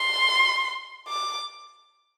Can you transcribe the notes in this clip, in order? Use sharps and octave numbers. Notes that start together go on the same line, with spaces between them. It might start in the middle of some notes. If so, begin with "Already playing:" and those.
Already playing: C6
D6